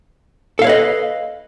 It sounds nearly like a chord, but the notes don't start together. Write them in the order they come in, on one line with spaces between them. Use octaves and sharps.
A4 F5 C#5 B4 D#5